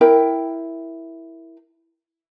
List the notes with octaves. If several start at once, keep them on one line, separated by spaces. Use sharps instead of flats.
E4 A#4 G5